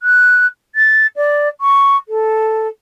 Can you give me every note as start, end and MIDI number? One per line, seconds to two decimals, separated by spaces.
0.03 0.46 90
0.75 1.06 93
1.16 1.48 74
1.61 1.96 85
2.08 2.68 69